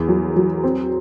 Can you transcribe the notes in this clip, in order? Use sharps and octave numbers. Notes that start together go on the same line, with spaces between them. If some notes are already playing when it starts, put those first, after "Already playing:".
Already playing: E2
F#3
F#3
C4